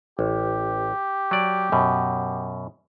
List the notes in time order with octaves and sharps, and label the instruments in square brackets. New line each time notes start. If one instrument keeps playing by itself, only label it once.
[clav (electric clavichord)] A1 [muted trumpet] G4
[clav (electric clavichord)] F#3 D5
F#2 B2